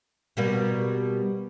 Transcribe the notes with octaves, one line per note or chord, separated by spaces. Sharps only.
B2 G3 A#3